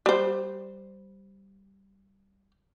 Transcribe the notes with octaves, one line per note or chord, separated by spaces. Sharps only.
G3 C5